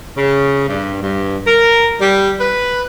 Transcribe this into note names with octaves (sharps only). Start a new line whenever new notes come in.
C#3
G2
G2
A#4
G3
B4